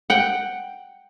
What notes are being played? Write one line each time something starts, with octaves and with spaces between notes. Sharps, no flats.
F#5 G5